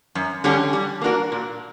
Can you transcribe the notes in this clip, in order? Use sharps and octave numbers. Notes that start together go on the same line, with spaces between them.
F#2
D3 G3 C#4 G4
G3
A#3 D4 F#4 A#4
A#2